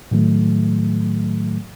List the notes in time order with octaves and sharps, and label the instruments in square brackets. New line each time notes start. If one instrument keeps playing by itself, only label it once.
[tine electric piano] A2 D#3 F#3 A3